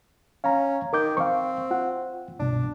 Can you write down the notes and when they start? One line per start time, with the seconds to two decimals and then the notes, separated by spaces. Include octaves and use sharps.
0.44 C#4 F5 A#5
0.93 D#3 A#4 D6 G6
1.17 C4 F5 C#6
1.71 F4 F#5
2.40 C2 G2 B2 D4